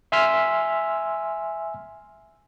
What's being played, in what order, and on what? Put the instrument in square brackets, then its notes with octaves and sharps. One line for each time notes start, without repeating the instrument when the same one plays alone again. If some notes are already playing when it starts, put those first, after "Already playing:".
[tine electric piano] E5 G#5 C6 E6 F6 B6